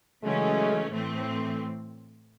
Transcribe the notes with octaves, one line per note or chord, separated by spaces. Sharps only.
C#3 E3 F#3 G#3 A3 C#4
A2 E3 A3 C4